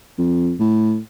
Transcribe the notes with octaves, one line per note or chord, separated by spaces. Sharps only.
F2
A2